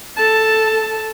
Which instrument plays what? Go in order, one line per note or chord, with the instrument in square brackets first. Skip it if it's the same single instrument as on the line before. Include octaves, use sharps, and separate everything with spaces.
[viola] A4 A5